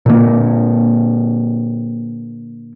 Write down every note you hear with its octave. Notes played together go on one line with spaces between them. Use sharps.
A#2 D3 A#3